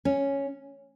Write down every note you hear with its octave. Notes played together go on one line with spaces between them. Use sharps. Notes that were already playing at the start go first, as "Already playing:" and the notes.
C#4